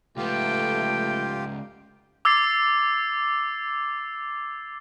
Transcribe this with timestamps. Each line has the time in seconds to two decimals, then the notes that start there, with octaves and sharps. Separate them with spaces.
0.17 C#2 A3 B3 F4 G4 G5
2.25 D6 E6 G#6 A6 C7